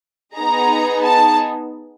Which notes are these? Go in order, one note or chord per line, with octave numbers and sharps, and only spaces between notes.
B3 D#4 G#4 A#5
A5